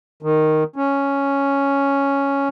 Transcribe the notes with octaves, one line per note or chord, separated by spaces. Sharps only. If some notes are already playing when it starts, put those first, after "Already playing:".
D#3
C#4